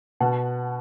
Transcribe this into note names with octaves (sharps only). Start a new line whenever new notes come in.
B2 F#5 A5